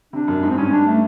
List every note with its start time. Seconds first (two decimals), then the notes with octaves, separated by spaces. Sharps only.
0.13 C3 D4
0.28 F#2
0.43 G#2
0.49 C4
0.57 G2 C#4
0.72 D4
0.87 A3